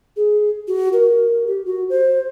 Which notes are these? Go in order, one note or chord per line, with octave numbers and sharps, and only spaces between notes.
G#4
F#4
A#4
G4
F#4
C5